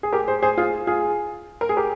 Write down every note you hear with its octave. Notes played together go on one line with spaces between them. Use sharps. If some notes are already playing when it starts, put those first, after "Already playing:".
G#4
G4 A#4
G#4 C5
G#4 C5
F4 G#4
F4 G#4
A#4
G#4
G4 A#4